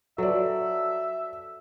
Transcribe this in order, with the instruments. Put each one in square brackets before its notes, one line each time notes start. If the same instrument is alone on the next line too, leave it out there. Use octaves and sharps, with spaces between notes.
[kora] F#3 [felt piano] A4 B4 D5 [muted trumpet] E5